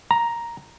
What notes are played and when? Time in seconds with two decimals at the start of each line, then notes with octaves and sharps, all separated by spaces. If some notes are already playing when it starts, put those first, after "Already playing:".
0.11 A#5